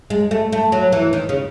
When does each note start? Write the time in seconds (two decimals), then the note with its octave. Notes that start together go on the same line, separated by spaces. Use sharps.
0.10 G#3
0.31 A3
0.52 A3
0.72 F#3
0.92 E3
1.13 D#3
1.29 C#3